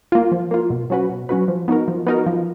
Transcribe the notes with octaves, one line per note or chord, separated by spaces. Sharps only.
A#3 F4
F3
A#3 F4
B2
F#3 C#4 F#4 B4
B2
F#3 C#4 F#4 B4
F3
B3 D#4 F#4 A#4
F3
B3 D#4 F#4 A#4
F3